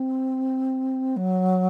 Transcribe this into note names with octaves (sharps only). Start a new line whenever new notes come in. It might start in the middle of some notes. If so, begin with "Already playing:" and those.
Already playing: C4
F#3